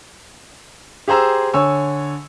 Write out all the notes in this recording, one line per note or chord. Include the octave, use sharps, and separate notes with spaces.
G4 G#4 C5 A#5 E6
D3 C#5 G#5 C#6 E6